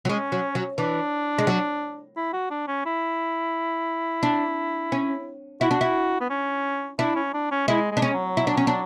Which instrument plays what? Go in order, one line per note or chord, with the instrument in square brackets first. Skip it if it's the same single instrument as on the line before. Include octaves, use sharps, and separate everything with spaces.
[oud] F#3
[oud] G#3 [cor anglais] C#4
[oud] F#3
F#3
[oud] E3 [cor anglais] D4
[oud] G#3
F#3
[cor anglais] E4
F#4
D4
C#4
E4
[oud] D4
C#4
[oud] E4 [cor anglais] F#4
[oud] D4
E4
[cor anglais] B3
C#4
[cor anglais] D4 [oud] E4
[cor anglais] C#4
D4
C#4
[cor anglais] G#3 [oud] E4
[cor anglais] G#3
[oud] D4
C#4
[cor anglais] F#3
[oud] E4
D4
C#4
D4